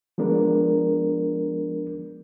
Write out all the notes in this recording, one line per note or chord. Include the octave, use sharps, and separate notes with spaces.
F3 G#3 B3 D4 A#4